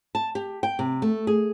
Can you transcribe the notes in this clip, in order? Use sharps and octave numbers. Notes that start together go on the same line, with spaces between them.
A5
G4
G5
C3
A3
G#4